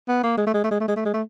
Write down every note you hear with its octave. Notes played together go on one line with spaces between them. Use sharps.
B3
A#3
G#3
A3
G#3
A3
G#3
A3
G#3
A3
G#3
A3